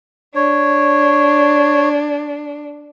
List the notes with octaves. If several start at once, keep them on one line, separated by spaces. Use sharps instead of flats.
D4 C#5